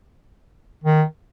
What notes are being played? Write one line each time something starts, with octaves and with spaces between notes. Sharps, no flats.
D#3